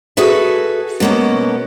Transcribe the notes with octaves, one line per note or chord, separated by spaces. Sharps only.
F#4 G#4 A4 B4 E5
B2 G#3 A#3 B3 C#4